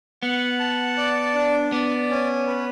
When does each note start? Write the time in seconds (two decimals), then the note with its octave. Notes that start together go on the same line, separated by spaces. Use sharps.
0.23 B3 F#5
0.60 A5
0.98 D5
1.35 D4
1.72 B3 D5
2.10 C#4
2.47 B4